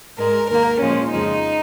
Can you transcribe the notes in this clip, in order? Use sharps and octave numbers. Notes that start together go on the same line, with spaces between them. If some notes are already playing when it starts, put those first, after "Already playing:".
G#2 G#3 A#4
D#2 D#3 A#3 A#4
A#2 F3 G#3 C#4
F2 C#3 F3 G#3 D#4